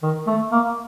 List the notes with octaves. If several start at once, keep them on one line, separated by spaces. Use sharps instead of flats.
D#3
A3
A#3